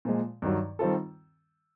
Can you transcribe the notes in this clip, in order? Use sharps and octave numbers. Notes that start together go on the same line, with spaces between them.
A#2 F3 G#3
G2 D#3 F#3
D#3 G3 C4 F4 A4